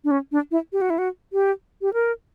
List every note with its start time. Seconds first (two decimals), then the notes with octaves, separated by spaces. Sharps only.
0.04 D4
0.11 C#4
0.32 D4
0.51 E4
0.73 G4
0.81 F#4
0.90 E4
0.98 F#4
1.33 G4
1.82 G4
1.94 A#4